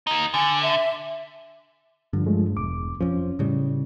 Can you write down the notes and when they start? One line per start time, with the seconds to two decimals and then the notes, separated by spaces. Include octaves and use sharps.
0.07 A#3 D#4
0.34 D3 G#5
0.62 E5
2.13 G2 D3 F3
2.26 F3 G#3 A3
2.57 E1 D6
3.01 F2 F3 C#4
3.39 A2 C#3 G3